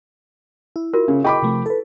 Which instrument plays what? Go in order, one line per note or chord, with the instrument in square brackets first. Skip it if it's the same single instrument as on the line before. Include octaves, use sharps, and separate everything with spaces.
[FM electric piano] E4
[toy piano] F4 F#4 A#4
[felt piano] C#3
[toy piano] E4 G#4 [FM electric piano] D#5 [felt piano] G5 B5 D6
[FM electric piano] C3 F3 A3
A4 B4